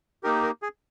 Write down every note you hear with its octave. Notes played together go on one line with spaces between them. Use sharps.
A#3 D#4 G4 A#4
A#4
G#4